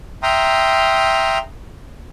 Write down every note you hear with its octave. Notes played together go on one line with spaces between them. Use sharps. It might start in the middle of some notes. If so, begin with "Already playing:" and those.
E5 G5 A#5 C6 D#6 F6